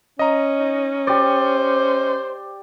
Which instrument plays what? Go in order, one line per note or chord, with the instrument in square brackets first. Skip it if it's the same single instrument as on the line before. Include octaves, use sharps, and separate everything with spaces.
[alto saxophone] C#4 [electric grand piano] D#5 A#5
[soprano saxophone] D#4
[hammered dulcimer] G4 D5 [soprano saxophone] C5